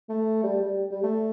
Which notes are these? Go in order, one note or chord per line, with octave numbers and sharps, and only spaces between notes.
A3
G3
G3
G3
A3